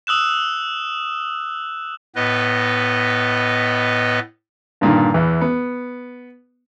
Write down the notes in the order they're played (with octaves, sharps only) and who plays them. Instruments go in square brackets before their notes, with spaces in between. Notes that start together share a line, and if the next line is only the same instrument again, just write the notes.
[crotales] D#6 E6 F#6 E7
[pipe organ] A2 B3 B4 D#5
[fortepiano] G2 A#2 D3 D#3
E2 E3
B3